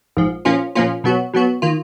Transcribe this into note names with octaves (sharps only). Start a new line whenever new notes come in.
A#1 G#2 F3
A#2 F3 A#3 C#4 F4
A#2 F3 A#3 C#4 F4
B2 F#3 B3 F#4
B2 F#3 B3 F#4
D#3 A#3 F4